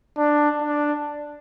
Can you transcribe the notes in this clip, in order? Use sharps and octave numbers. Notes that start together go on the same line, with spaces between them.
D4
D4